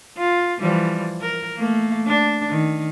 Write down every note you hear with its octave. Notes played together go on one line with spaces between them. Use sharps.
F4
E3 F3 G3
A#4
A3 A#3
D4
D#3